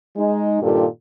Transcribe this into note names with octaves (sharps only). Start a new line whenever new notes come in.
G#3 D#4
G2 A#2 D#3 F4 G4 A4